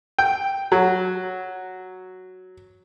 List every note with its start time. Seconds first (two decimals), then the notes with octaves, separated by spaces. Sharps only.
0.19 G5
0.72 F#3